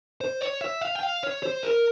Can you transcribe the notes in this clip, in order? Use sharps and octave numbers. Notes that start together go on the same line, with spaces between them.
C5
C#5
E5
F5
G5
F5
C#5
C5
A#4